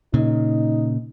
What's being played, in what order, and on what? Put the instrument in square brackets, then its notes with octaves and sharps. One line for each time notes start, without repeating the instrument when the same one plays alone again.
[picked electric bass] A#2 C#3 [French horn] D#4